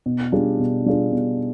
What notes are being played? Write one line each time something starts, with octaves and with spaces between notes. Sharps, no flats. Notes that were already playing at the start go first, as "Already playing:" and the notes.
B2
G3 D4 F4 G#4
B2
G3 D4 F4 G#4
B2